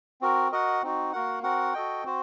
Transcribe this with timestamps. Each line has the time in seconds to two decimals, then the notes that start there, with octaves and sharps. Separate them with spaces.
0.21 C4 F#4 A#4
0.52 F#4 A#4 D#5 F#5
0.82 C4 D#4 F#4
1.13 A#3 F#4 A#4 F#5
1.43 C4 F#4 A#4 F#5
1.74 F#4 A4 D#5 G5
2.04 C4 F#4 C5